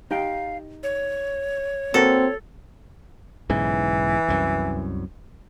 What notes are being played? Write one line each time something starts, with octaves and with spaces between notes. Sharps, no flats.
D#4 G4 F5 G5
C#5
A#3 C4 F#4 A4 A#4
B1 G#2 C#3 E3
C2 F#2